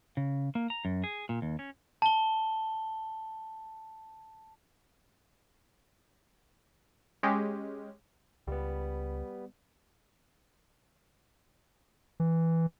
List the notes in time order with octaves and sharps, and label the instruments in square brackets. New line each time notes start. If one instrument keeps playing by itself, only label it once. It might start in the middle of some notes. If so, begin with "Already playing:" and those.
[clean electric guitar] C#3
A#3
A#5
F#2
G#4
A#2
D#2
C#4
[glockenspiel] A5 G7
[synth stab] G#3 C#4 G4
[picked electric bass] C#2 [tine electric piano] G3 B3
[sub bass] E3